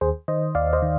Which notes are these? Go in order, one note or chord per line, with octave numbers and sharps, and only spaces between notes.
D#2 G#4 C5
D#3 C5 D#5
D#2 D5 F5
C5 D#5
D#3